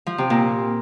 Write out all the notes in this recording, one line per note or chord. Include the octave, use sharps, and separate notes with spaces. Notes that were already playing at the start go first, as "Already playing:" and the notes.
F3
C3
A#2